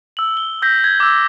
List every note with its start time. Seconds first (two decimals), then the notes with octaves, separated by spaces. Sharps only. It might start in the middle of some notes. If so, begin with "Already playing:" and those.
0.17 E6 F#7
0.37 G7
0.62 E6 G6 A#6 B6
0.84 G#6
1.00 D6 E6